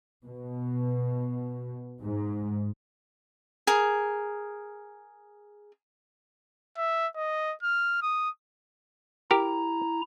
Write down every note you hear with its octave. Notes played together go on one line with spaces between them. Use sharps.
B2
G#2
G#4 A#4
E5
D#5
F6
D#6
E4 G4 A#4 A#5